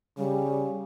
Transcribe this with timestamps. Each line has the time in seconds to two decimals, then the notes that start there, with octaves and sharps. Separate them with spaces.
0.18 C#3 G3